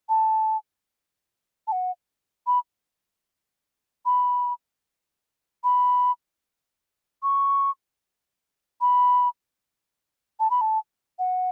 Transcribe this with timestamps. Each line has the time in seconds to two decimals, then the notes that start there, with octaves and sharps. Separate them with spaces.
0.09 A5
1.67 A5
1.72 F#5
2.47 B5
4.05 B5
5.64 B5
7.23 C#6
8.81 B5
10.40 A5
10.50 B5
10.61 A5
11.19 F#5